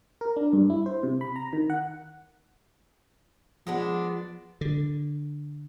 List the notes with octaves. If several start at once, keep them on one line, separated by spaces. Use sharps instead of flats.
A#4
D4
G2
E4
C5
C3
B5
A#5
D#3
F#5
F3 G#3 B3 D4
D3